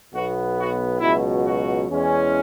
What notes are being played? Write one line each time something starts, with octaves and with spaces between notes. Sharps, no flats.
B1 B2 B3 F#4
F#4
C#2 B2 F#3 E4
F#4
E2 E3 G#3 C#4